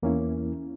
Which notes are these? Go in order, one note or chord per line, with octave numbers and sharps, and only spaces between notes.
E2 E3 A#3 C#4 E4